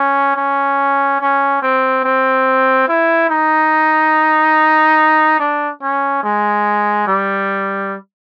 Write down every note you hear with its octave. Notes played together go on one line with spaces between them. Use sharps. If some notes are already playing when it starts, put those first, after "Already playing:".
Already playing: C#4
C#4
C#4
C4
C4
E4
D#4
D4
C#4
G#3
G3